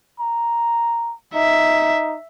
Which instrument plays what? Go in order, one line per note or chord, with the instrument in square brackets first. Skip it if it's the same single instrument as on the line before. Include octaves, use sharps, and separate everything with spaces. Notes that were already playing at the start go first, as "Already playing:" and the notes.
[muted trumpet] A#5
[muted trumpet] D#4 [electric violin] E5